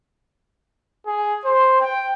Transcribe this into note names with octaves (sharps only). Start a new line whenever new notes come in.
G#4
C5
G5